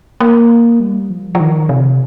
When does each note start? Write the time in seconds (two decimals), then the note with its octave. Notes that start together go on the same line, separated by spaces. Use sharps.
0.20 A#3
0.80 G3
1.10 F3
1.35 F3
1.40 D#3
1.69 C3